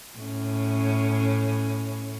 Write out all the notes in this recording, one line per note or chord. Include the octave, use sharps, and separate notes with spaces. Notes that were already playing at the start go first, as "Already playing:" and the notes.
A2 C#4